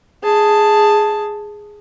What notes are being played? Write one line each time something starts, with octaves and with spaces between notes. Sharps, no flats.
G#4 A5